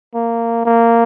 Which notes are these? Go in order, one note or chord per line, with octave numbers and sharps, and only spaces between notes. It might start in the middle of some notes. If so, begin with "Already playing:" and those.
A#3
A#3